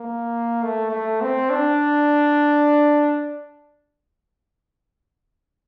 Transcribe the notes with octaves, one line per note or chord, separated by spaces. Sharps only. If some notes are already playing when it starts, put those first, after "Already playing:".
Already playing: A#3
A3
A3
C4
D4